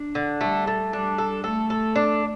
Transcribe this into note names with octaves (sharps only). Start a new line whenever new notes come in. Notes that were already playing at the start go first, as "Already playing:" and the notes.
Already playing: D4
D3
G3 A3
A3
G3 D4
A4
A3 A4
A4
D4